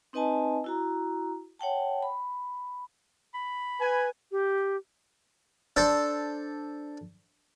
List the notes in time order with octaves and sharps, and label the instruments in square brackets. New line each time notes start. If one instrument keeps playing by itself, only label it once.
[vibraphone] C4 D#4 B4 D#5 G#5 A5
E4 F#4 A#5
C#5 F#5 G5 A5
B5
[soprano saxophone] B5
[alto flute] B4 [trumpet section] G#5
[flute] G4
[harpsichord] D4 A4 C5